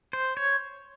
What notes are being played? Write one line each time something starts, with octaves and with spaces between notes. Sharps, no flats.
C5
C#5